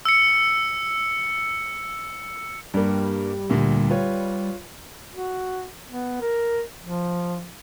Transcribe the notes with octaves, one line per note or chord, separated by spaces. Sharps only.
E6 C#7
G2 G3 A#3
D2 A#2 D3
F4 B4 C#5
F#4
B3
A#4
F3